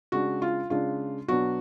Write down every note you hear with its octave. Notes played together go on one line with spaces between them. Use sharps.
C#3 G#3 D4 F#4
F4
C#3 G#3 D4 F4
B2 F#3 B3 D4 F#4